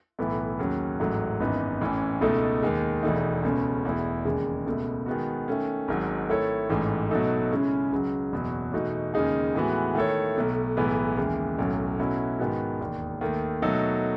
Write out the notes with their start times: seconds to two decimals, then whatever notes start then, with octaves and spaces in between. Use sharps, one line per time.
0.19 B1 A2 E3 B3
0.59 D#2 C#3 F#3 C#4
1.00 A1 G#2 F#3 A3
1.40 G#1 F#2 E3 B3 D#4
1.81 A1 A2 E3 A3 C#4
2.21 C#2 B2 A3 D#4 A4
2.63 D#2 D#3 G#3
3.03 E1 E2 B2 A3 D#4
3.43 C#2 B2 A3 C#4
3.84 E1 E2 B2 A3 E4
4.25 E1 D#2 C#3 G#3
4.66 C#2 B2 A3
5.06 D#3 G#3 B3 F#4
5.48 D#3 A3 C#4
5.88 G#1 G#2 F#3
6.29 D#3 A3 E4 A4 C#5
6.69 A1 G#2 E3 A3
7.11 B2 F#3 A3 D#4 A4
7.51 C#3 G#3 C#4 E4
7.91 C#2 C#3 F#3
8.32 F#1 E2 B2 F#3
8.73 E2 B2 A3 D#4 F#4
9.14 D#2 C#3 G#3 D#4 G#4
9.54 A2 E3 G#3 B3 F#4
9.95 D#3 A3 E4 A4 C#5
10.35 B1 B2 A3
10.77 B1 A2 E3 G#3 B3
11.17 D#2 C#3 E3 G#3
11.58 B1 A2 F#3 C#4
11.99 B2 F#3 A3 C#4 E4
12.39 G#2 D#3 G#3 B3 F#4
12.80 E1 D#2 D#3
13.21 D#2 D#3 A3
13.62 B2 F#3 A3 D#4 A4